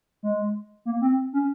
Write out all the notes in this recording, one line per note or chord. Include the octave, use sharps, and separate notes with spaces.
G#3
A#3
C4
C#4